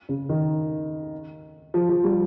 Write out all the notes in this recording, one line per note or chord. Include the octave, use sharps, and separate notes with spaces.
C#3
D#3
F3
F3
G3